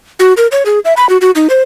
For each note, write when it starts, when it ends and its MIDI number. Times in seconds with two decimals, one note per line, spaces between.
0.19 0.33 66
0.37 0.47 70
0.52 0.63 73
0.66 0.79 68
0.85 0.93 76
0.97 1.08 83
1.09 1.17 66
1.21 1.31 66
1.35 1.47 63
1.50 1.62 72